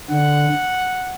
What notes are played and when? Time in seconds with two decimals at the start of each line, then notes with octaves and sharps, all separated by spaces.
0.10 D3 F#5